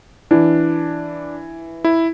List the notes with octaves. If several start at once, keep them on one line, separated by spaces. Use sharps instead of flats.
E3 D4
E4